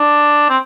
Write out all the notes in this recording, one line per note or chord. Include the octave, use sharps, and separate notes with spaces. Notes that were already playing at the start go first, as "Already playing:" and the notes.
Already playing: D4
C4